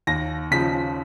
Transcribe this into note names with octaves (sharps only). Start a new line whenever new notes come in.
D#2 A#6
C#3 F3 B6